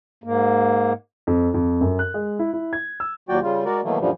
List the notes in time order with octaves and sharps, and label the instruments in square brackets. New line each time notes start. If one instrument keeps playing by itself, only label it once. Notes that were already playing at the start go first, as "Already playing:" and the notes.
[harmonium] G#2 A#3
[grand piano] F2
F2
F#2
F#6
G#3
E4
E4
G#6
E6
[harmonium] D#2 A#2 F#3 F#4 D5 G5
C#3 G3 F4
G#3 F#4 A#4 D5
B2 D#3 E3 F#3 A3 A#3
F#2 A#2 D3 E3 F3 G3